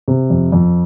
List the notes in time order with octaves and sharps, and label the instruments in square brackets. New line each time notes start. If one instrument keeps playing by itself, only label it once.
[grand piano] C3
F2
F2